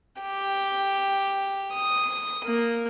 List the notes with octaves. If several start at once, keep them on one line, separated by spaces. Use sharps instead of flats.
G4
D#6
A#3